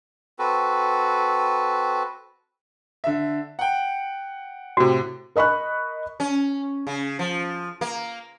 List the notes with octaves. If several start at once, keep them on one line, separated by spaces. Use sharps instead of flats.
C4 F#4 A4 B4
D3 E5
F#5 G5
A2 C3 F#4
A#4 D#5 B5 C#6 F#6
C#4
C#3
F3
A#3